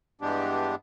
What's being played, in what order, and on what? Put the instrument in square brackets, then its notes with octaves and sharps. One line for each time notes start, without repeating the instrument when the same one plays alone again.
[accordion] G2 E3 G#3 B3 D4 G4